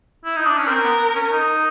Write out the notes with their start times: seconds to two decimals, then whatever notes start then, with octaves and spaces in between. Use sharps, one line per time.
0.25 E4
0.36 D#4
0.47 D4
0.58 C#4
0.68 C4 A#4
0.84 B3
1.15 C#4
1.31 D#4